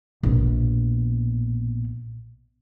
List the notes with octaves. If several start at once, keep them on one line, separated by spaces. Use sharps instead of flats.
A#1 B2